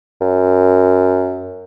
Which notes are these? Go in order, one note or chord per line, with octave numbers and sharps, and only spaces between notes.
F#2